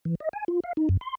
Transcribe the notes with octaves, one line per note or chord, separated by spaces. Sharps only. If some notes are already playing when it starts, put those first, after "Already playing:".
E3
D#5
G#5
F4
F5
D#4
F#2
C6